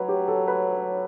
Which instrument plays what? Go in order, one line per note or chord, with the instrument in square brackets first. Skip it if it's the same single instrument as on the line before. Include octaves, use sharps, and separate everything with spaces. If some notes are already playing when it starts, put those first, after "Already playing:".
Already playing: [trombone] F#3 [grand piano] B4 C#5
[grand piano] G4
A4
B4
C#5